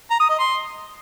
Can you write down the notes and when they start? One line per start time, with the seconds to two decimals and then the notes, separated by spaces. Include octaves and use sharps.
0.10 A#5
0.20 D#6
0.29 D#5
0.39 C6